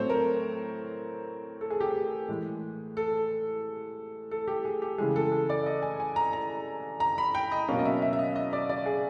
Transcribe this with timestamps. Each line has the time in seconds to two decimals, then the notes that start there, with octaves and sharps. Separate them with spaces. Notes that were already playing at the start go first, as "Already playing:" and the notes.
Already playing: A2 F#3 A3 C4 C5 C#5
0.10 A#4
1.61 A4
1.70 G#4
1.81 G4
1.90 G#4
2.29 A2 E3 G#3
2.97 A4
4.31 A4
4.48 G4
4.65 G#4
4.82 G4
4.98 C#3 E3 G#3 G#4
5.16 A4
5.32 G#4
5.49 D5
5.66 D#5
5.82 G#5
6.00 G#5
6.16 A#5
6.33 A#5
7.00 A#5
7.18 B5
7.35 G5
7.52 D#5
7.69 B2 F#3 A#3 C#4 F5
7.79 D#5
7.86 E5
8.02 E5
8.13 E5
8.19 D#5
8.36 D#5
8.53 D5
8.69 D5
8.86 G#4